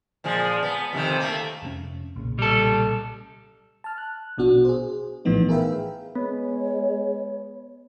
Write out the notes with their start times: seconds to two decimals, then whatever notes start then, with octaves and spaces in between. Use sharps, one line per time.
0.24 A#2 F3 G#3
0.63 B3
0.93 F2 C3 D#3
1.19 A3 A#3
1.62 F1 A#2 C#4
2.16 B1 A#2 C#3
2.39 G3 A4
3.84 A5 F6
3.98 F#6
4.38 A#1 B2 D4 F#4
4.65 G#4 C5
5.25 A#1 A2 E3 F3 B3 D#4
5.49 G#4 A#4 B4 E5 F5 G5
6.15 G#3 B3 C#5